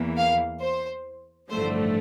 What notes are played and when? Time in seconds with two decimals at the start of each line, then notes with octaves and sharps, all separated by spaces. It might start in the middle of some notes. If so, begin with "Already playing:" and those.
Already playing: E2 E3 A#3
0.17 F5
0.62 C5
1.50 A1 G2 D3 F3 A3 C5